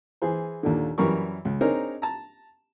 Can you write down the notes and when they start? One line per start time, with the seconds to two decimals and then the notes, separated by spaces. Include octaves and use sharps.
0.22 E3 G#4 C5
0.63 D#2 A#2 D3
0.98 F#2 E3 G3 A#4 C#6
1.45 C#2
1.61 C4 D4 D#4 G#4 A#4 C#5
2.02 A5 A#5